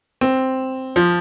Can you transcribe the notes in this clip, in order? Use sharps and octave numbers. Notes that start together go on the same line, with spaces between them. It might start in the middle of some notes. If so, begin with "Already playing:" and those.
C4
F3